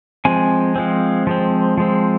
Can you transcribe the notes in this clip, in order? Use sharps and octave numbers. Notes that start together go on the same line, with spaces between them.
F3 G#3 C4 G#5
F3 G#3 C4
F3 G#3 C4
F3 G#3 C4